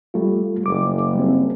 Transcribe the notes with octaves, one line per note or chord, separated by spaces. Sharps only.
G3 A3 F4
F#1 D6
G3 C4